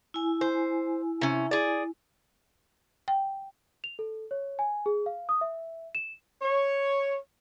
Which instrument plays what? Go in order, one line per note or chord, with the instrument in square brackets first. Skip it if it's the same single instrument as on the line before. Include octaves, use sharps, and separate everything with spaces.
[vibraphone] E4 G#5
[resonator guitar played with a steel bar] C5
C3 C#4
G#4 D5
[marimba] G5
[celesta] F7
A4
C#5
G#5
G#4
F5
D#6
E5
E7
[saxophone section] C#5